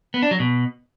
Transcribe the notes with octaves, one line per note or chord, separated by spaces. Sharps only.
B3
D4
F#3
B2